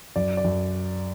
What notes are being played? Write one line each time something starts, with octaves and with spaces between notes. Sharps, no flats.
F#2 D5
D5
F#2